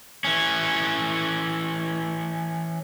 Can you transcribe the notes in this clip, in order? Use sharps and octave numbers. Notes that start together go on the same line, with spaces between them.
E3 C#4